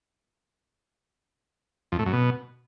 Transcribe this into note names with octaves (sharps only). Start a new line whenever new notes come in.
F2
A2
F#2
B2